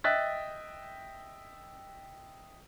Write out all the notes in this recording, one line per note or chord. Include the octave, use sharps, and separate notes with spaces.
D#5 E5 G5 F#6 A6 B6